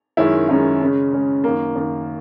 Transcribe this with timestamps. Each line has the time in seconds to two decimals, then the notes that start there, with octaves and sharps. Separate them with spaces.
0.17 F#2 D#3 G#3 C#4 E4
0.49 F#2 D#3 G#3 C#4 E4
0.81 C#3 G#3 C#4
1.13 C#3 G#3 C#4
1.44 F#2 D#3 A#3
1.75 F#2 D#3 A#3